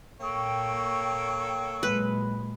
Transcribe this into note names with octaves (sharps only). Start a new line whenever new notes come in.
A#2 A#3 A4 C#5 G5 C#6
A#2 F#3 G#3 B4